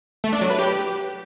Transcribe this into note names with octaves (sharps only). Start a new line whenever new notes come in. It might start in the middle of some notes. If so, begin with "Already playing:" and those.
A3
D4
F#3
B4
G4